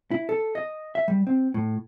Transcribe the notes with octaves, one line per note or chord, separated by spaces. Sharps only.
E4
A4
D#5
E5
G3
C4
A2